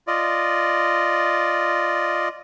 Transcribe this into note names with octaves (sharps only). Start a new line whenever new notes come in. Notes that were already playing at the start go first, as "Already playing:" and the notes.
F4 D5 D#5